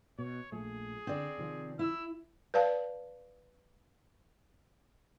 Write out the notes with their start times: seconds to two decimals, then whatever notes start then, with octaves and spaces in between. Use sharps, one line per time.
0.19 B2 C#5
0.52 A#1 F3 A3 G#4
1.07 D3 C4 D5
1.38 C3 D#3 F3
1.79 E4 E6
2.54 B4 D5 F5 A5